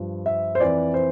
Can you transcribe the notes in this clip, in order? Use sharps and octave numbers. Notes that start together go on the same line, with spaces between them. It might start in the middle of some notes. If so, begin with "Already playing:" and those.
Already playing: G2 F3
E5
C5
F2 E3 D5
C5